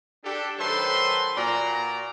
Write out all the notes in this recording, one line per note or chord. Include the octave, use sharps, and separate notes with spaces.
D4 G4 A4
D#3 F#3 A4 B4 C5 C6
A#2 F#4 D5 A#5